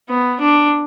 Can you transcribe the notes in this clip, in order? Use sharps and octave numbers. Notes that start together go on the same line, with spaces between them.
B3
D4